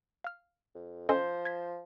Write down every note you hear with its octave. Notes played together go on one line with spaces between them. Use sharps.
F5 F6
F2
F3 C#4 A4 C5 D#5
G#6 A6 B6